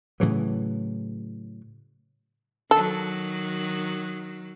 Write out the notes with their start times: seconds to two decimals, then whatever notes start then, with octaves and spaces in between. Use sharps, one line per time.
0.20 A2 C#3 E3 F#3
2.71 D#3 F#3 A4